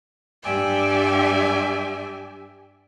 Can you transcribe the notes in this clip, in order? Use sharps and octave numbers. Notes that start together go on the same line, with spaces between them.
G2 G4 D5 E5 G5 G#5